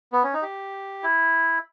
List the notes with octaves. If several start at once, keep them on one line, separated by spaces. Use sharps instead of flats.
B3
C#4
D#4
G4
E4